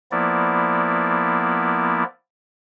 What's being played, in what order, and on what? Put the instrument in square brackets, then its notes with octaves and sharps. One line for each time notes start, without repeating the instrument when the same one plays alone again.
[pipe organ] F3 A#3 B3 E4 D5